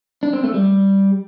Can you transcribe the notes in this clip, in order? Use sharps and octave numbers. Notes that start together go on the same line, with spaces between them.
D4
C4
A3
G3